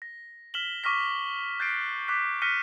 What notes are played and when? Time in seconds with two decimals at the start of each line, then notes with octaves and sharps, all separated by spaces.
0.02 A#6
0.54 F6 B6 E7 F#7 G7
0.84 C#6 D6 F6 A#6 B6
1.60 F#6 G6 A6 B6 C7 D7
2.08 D6 F#6 B6
2.42 F6 F#6 A#6 B6 C#7 D#7